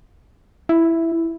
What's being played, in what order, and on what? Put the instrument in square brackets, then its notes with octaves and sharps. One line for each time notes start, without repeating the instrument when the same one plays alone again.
[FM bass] E4